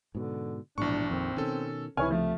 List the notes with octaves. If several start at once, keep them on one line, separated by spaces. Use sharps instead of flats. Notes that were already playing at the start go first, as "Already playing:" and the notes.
G#2 B2 D3
A#1 G#2 B2 E3 D4 C#6
F2 D#3 C4
B2 D#3 C#4 A4
C#2 C3 E3 E4 C#5 G#5 F6
F3 A3